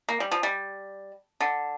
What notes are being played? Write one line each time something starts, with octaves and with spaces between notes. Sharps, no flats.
A#3
G3
F3
G3
D3